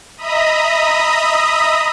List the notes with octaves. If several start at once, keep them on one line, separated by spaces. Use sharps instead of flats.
D#5 E5 A#5 B5 D#6